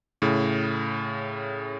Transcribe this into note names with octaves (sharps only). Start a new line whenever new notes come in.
A2 C#3